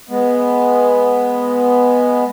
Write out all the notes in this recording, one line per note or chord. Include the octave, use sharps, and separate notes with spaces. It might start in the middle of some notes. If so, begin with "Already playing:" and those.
G#3 B3